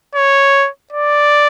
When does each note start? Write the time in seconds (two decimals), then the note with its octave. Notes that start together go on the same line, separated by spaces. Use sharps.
0.15 C#5
0.93 D5